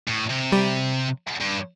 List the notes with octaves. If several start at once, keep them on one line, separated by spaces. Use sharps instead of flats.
A2
C3
G3
G2